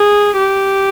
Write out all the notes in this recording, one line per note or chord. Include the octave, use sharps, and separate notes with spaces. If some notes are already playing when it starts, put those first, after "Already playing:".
Already playing: G#4
G4